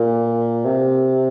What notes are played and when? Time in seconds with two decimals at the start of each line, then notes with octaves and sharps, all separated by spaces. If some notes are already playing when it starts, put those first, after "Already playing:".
Already playing: A#2
0.66 C3